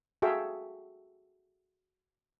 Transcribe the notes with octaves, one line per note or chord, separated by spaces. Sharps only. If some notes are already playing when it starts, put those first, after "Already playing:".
F#4 G#4 A4 E5 F5 G5